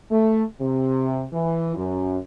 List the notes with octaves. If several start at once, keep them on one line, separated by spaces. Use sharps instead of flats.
A3
C3
E3
F#2